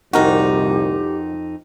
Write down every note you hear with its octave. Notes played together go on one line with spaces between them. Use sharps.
C2 F2 A#2 D#3 D#4 F#4 G4 A#4